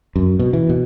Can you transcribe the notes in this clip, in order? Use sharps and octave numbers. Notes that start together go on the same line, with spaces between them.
F#2
B2
E3
B2